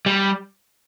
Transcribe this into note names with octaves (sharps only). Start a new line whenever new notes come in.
G3